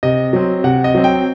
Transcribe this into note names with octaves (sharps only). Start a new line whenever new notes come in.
C3 D#5
F#3 C4
C3 F#5
D#5
F#3 C4
G5